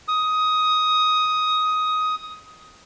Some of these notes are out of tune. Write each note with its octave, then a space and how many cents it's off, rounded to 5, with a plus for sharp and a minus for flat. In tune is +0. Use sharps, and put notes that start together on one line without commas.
D#6 +10